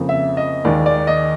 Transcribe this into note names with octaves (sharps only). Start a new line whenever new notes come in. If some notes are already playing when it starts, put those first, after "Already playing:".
Already playing: F2 C#3 F3 A#3
E5
D#5
D#2 D#3 G#3 D5
D5
D#5